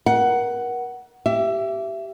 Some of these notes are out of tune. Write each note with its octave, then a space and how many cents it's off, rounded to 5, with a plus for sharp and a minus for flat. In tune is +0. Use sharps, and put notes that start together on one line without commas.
A#4 +35 F#5 +10
G4 -20 E5 +20